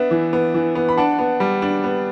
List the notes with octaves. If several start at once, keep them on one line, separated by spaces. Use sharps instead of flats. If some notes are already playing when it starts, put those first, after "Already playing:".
Already playing: B3 D4 E5
E3
B3
E3
B3
B5
D4 F#5 A5
B3
G3
D4
B3